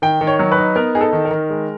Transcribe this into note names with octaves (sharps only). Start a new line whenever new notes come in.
D#3 G5
D#3
C#5
F#3
B4
D#4
B3 A#4
D#4 G#4
A4
D#3
A#4
D#3
G#3